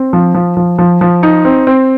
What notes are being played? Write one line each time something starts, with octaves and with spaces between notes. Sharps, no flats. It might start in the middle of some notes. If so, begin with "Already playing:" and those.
Already playing: C4
F3
F3
F3
F3
F3
D#4
C4
C4